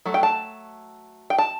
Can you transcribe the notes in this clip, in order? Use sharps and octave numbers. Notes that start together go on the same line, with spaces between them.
F#3 A3
G5
A5
G5
A5